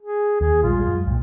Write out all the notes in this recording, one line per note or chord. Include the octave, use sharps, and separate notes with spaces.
G#4
D#2 G#4
A#1 G3 G#3 F4
F#2
C2 A#2